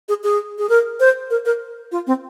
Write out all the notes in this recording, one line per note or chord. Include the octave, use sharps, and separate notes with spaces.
G#4
G#4
G#4
A#4
C5
A#4
A#4
F4
C4